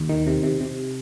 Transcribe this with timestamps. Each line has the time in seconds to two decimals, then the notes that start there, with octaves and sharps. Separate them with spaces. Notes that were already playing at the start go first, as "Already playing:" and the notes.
Already playing: D#2
0.09 D#3
0.27 C3
0.43 C3
0.61 C3